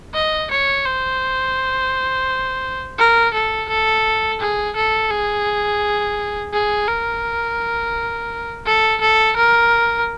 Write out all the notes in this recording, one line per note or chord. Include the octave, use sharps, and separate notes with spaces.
D#5
C#5
C5
A#4
A4
A4
G#4
A4
G#4
G#4
A#4
A4
A4
A#4